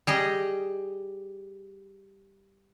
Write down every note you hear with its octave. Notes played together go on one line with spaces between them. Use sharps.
G3 G#4 D#5